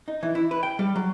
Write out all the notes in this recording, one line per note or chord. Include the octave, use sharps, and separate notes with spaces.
D#4
E3
E4
B4
G5
G3
F#3